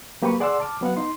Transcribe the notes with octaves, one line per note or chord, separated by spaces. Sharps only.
F#3 A#3 G4 B4 B5 C#6
G#4 D5 F#5 C6 D6 E6
A5 D6 F6
F#3 B3 F5 F#5
D#4 C6